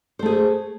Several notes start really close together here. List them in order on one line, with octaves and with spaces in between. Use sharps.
C5 A3 G#4